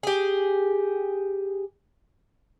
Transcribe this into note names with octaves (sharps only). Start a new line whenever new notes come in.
G4 G#4